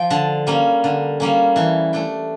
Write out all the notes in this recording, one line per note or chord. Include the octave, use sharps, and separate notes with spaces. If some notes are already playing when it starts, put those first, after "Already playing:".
Already playing: F3 G5
D3 A5
G3 A#3 C#4
D3
G3 A#3 C#4
E3 A5
A3 D4 G5